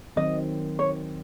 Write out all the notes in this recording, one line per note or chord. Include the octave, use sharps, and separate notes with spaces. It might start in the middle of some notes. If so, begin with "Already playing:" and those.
D#3 F#3 C4 D#5
C#5